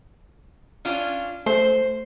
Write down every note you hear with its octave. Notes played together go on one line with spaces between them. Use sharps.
C#4 D4 F4
A3 C5